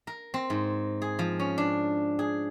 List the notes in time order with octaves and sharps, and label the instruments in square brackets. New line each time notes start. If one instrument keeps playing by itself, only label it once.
[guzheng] A#4
C4
G#2
G#4
F3
C#4
D4
G#4